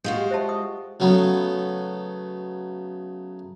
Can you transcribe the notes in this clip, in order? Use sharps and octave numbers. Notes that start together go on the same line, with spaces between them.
G#3 F4 F#4 G6
G4 G5
C5 E5 A5
D#6
C#3 F#3 A3 B3